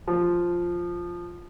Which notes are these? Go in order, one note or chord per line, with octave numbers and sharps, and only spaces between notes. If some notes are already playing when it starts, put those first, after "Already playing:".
F3